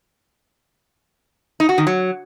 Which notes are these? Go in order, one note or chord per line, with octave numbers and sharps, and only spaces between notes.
D#4
F#4
D#3
F#3